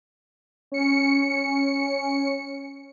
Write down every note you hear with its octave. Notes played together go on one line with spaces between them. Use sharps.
C#4 C#7